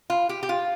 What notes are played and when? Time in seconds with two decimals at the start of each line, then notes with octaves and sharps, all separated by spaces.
0.10 F4
0.29 G4
0.43 G4
0.49 F4